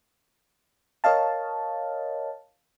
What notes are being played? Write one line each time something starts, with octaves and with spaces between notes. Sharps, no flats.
A#4 C#5 D#5 F5 A5